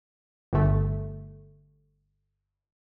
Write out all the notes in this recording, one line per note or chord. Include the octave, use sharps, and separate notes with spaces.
G1 A3